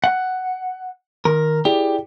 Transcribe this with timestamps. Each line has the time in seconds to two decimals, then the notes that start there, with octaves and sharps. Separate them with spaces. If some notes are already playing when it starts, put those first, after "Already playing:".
0.04 F#5
1.25 D#3 A#4
1.65 E4 G4 G#4 D5